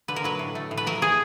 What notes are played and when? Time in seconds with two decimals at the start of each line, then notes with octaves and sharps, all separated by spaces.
0.08 D3 B4
0.16 A#4
0.24 F#3 B4
0.39 A2
0.55 A3
0.71 A2
0.77 B4
0.86 F#3 A#4
1.02 A2 G#4